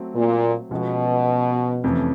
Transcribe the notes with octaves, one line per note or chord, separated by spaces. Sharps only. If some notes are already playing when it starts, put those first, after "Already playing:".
Already playing: F#3 A3 C4
A#2
B2 F3 G#3 C#4 F#4 A4
F2 C3 E3 A3 C#4